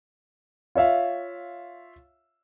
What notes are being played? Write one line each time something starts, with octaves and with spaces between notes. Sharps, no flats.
F4 C#5 E5 F5